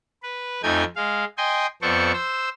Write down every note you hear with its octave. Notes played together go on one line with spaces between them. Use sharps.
B4
F2 A3 D#4 G5 G#5 G#6
G#3 F5
D#5 G5 G#5 C6
F2 B3 A4 C5 D5 C#6
C5 E6